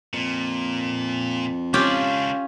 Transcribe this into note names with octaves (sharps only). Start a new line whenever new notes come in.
F2 A#2
C#2 C#4 D4 F4 G4